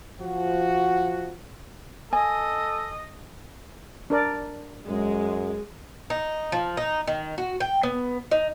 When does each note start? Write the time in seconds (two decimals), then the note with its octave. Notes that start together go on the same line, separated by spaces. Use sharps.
0.21 F3 F#4
2.13 A4 D#5 G#5
4.10 D4 A#4 D5
4.88 F#2 G#3
6.10 D#4
6.52 F3
6.77 D#4
7.07 D#3
7.38 F#4
7.60 G5
7.83 B3
8.31 D#4